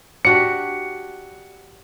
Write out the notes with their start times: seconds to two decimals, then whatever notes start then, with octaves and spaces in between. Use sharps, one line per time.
0.25 D4 F#4 G4 C#7